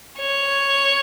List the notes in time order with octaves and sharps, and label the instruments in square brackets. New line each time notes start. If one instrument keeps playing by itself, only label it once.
[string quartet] C#5